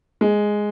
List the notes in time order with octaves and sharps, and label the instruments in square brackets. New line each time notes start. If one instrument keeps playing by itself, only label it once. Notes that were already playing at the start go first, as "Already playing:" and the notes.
[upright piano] G#3